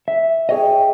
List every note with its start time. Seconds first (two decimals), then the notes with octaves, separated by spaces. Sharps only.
0.08 E5
0.49 G#4 C#5 D#5 G5